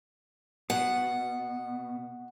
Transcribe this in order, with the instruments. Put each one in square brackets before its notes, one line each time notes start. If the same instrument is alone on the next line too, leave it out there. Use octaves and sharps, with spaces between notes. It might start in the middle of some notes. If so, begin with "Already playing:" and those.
[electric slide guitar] B2 [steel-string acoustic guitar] F#5